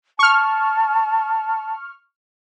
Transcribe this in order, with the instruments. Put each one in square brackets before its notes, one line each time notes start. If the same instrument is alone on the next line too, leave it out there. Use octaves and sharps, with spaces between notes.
[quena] A5 [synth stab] C#6 F6